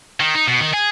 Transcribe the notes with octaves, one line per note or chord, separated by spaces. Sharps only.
D#3
D#4
B2
D#3
G#4